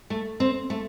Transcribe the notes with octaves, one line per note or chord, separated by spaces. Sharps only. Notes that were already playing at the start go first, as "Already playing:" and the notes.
A3
C4
A3